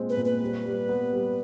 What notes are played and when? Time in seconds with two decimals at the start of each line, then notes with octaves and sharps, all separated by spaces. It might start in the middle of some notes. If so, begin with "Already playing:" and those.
Already playing: A#2 G#3 C4
0.10 B4
0.17 A#2
0.25 B4
0.42 G3
0.66 G3
0.89 B3
1.13 G3